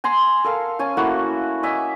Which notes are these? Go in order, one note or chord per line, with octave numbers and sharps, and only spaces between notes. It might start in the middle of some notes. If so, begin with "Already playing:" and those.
G#5 A#5 C6
A4 A#4 F5
C#4 G#5 A5
A3 A#3 E4 F#4
D#5 E5 G#5